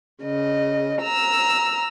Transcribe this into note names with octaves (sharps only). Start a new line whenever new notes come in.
C#3 D#5
A#5 E6 F6